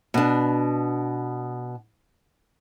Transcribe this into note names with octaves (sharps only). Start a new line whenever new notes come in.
B2 D4